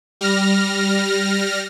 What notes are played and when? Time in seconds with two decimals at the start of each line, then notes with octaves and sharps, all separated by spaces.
0.21 G3 F6 A#6